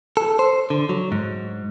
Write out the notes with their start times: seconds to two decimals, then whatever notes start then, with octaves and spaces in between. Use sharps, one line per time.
0.17 A4
0.39 C5
0.70 D3
0.89 F#3
1.12 G#2